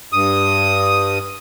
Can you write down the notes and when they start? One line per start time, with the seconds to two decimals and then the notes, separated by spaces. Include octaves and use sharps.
0.13 G2 D#6